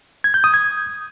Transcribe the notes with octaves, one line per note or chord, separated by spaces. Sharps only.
G#6
G6
D#6
G#6